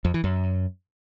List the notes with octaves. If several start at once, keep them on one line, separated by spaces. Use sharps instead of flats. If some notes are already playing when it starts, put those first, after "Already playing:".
F2
E3
F#2